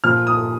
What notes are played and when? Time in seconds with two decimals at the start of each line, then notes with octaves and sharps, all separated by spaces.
0.04 A#2 F3 F6
0.27 D#6